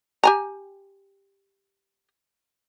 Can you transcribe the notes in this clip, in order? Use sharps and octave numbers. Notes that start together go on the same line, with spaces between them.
G4 G#5 A#5